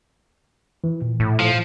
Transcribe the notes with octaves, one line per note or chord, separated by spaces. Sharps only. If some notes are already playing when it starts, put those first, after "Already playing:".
E3
A#2
A2
F3